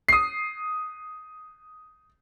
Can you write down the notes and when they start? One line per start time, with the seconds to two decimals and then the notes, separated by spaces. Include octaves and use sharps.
0.09 D#6 C7